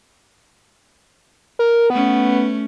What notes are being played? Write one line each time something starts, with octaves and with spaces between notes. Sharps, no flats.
A#4
A3 B3 C#4